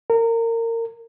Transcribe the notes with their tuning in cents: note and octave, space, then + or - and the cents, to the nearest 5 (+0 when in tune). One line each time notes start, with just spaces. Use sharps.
A#4 -25